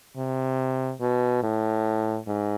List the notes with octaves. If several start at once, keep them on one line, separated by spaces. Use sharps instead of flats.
C3
B2
A2
G#2